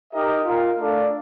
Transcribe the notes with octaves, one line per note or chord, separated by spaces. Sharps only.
D#4 G4 A#4 D#5
F4 A#4 F5
A3 D4 A4 D5 F5